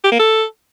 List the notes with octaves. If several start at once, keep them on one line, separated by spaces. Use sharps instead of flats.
G4
A#3
A4